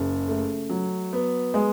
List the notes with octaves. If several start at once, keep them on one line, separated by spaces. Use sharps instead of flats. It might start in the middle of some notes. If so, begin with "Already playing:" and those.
Already playing: F#1 C#3
A3
F#3
B3
G#3